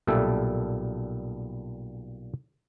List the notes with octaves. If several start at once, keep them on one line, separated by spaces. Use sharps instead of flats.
B1 A#2 G3 A4 E5